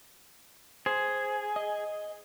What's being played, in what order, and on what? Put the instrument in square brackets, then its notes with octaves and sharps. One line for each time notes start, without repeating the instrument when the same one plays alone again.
[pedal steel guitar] G#4 [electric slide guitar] C5
[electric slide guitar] D#5